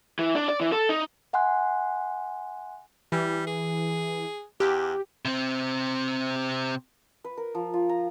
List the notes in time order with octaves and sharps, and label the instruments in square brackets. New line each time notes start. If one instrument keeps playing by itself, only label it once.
[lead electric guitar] E3
D4
D5
E3
A4
D#4
[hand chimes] E5 F#5 G#5 C6 F#6
[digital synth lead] E3 [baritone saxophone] G3
[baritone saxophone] G#4
[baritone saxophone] E2 [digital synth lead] G4
[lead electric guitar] C3 C4
[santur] B4
A#4
F3
F4
A#5